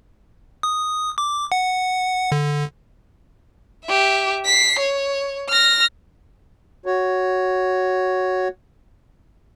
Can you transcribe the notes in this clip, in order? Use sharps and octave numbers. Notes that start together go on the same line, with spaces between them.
D#6
D6
F#5
D3
G4 E5
B6 C7
C#5
F6 A#6
F#4 C#5